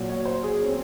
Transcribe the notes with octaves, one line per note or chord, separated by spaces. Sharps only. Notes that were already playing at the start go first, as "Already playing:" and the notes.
Already playing: A#2 F#3
C#5
C5
G#4
C#4
C4